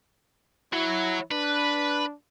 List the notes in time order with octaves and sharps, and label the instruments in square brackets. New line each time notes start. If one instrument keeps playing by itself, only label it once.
[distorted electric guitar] F#3 [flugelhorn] E4
[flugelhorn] D4 [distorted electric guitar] B4